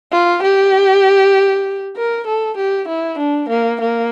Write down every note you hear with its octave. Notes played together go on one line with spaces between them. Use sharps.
F4
G4
A#4
A4
G4
E4
D4
A#3
A#3